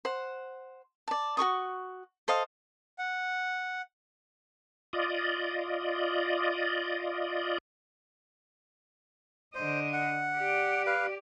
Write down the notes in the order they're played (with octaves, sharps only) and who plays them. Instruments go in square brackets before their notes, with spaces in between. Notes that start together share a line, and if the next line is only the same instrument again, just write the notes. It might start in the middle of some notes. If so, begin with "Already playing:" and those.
[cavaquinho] C5 F#5
D5 A5
F#4 A4 C#6 D#6
A4 C5 D#5 F5
[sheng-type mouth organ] F#5
[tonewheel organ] F4 D5 D#5
[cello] D3 D#5 [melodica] C5
[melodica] F#5
[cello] G4 D5
[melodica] B4 F5